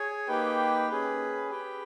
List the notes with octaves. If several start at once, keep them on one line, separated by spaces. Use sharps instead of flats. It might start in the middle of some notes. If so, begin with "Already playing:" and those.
Already playing: G#4 C#5 G#5
A#3 D#4 G4 B4 G5
C#4 G#4 B4
G4 B4 G5